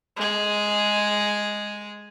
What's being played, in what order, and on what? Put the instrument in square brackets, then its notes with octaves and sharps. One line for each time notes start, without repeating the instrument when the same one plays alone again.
[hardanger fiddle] G#3 G#4